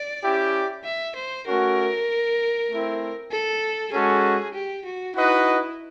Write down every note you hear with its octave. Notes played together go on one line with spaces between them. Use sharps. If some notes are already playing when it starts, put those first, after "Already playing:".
Already playing: D5
C#4 E4 G4
E5
C5
A3 C#4 F#4 A#4
A3 C4 E4
A4
G#3 C#4 F#4 G#4 A4
G4
F#4
D#4 E4 F#4 B4 D#5